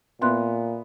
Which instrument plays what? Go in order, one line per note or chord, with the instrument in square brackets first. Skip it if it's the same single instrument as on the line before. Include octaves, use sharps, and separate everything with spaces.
[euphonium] A#2 [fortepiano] B3 [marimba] E5 C6 F#6